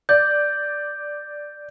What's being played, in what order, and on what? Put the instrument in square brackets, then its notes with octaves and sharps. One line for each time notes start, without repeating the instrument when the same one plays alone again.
[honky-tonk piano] D5 [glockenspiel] G6